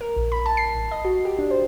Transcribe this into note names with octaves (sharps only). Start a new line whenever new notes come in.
A#4
A#1
B5
A5
C7
A1
D#5
F#4
G4
D4
C5